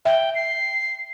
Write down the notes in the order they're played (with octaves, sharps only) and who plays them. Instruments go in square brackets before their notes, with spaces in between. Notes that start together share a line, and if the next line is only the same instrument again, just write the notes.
[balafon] E5 [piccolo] G5
[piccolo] C7